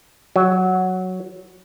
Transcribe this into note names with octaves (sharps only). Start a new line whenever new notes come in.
F#3